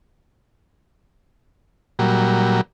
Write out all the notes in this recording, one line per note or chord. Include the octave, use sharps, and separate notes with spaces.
A#2 F#3 G3